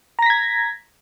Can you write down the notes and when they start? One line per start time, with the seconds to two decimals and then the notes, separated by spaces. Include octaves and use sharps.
0.19 A#5
0.22 A#6
0.26 B6
0.30 G#6